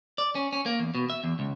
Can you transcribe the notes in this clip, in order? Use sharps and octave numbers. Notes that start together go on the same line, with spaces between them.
D5
C#4
C#4
A#3
E2
B2
E5
E2
C#2